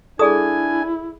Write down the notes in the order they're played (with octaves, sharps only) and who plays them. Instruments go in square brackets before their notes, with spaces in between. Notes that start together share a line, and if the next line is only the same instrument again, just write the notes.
[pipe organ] D4 G#5 [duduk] E4 [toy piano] G#4 D#6 [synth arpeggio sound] A4 D5